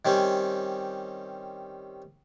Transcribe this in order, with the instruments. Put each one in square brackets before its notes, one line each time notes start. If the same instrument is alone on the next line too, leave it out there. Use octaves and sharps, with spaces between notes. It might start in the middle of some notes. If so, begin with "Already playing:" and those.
[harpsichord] D#3 G3 C4 C#4